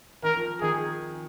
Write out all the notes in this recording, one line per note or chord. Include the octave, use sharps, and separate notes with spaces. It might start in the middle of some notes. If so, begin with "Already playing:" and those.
D#3 A#4
F3
D#3 G#4